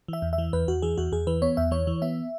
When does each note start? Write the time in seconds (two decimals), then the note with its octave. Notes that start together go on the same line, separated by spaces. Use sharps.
0.08 E3 E5
0.22 E2
0.33 E5
0.38 E3
0.53 E2 B4
0.68 E2 F#4
0.82 E3 G#4
0.98 E2 F#4
1.12 E2 G#4
1.27 E3 B4
1.42 B3 C#5
1.57 E2 E5
1.71 E3 C#5
1.87 E3
2.02 B3 E5